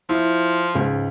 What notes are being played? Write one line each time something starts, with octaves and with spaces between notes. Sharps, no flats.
F3 E4
C#2 G#2